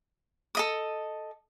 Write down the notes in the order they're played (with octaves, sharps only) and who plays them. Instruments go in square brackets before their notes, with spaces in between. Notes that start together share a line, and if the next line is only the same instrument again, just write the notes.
[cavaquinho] A4 D#5 D#6